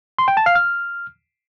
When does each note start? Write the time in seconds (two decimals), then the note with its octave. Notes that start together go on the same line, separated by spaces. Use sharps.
0.19 C6
0.28 G5
0.37 A5
0.46 F5
0.55 F6